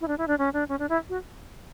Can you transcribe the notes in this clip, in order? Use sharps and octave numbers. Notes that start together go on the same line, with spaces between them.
E4
D4
E4
D4
C#4
D4
C#4
D4
E4
F#4